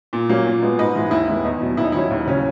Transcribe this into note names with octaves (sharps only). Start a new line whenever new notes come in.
A#2
F#3 A#3 C#4
A#2
G#3 B3
G#2 B4 D#5
E3 G#3
D#2 E4
D#3 G#3 B3
E2 D#4
B2 F#3
D#2 E4
D#4
D#3 F#3 C#4 E4
D#2
C#3 F#3 C#4